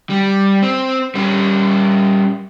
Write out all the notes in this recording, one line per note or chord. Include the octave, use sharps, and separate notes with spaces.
G3
C4
G3 C#4